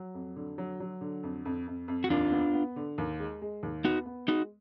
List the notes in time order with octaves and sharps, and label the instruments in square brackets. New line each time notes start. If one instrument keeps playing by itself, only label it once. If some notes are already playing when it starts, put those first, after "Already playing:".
Already playing: [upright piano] F#3
F2
D3
F#3
F#3
D3
F2
F2
F2
F2
[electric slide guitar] F#4
[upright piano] D#2 [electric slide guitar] D4 F4
[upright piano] B3
B3
D3
D#2
G#3
G#3
D#2
[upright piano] B3 [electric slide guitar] D#4 F#4
[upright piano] B3
[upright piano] G#3 [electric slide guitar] D#4 F#4